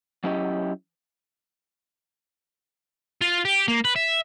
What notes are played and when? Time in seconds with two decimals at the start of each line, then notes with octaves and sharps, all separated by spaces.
0.24 F#3 C#4 E4 G4 D#5
3.21 F4
3.45 G4
3.68 A#3
3.85 B4
3.96 E5